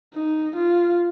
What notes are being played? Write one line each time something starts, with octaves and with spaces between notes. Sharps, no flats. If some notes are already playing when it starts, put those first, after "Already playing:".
D#4
F4